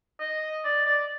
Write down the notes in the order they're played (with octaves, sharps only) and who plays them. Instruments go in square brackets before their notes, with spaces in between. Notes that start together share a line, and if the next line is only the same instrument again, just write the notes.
[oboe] D#5
D5
D5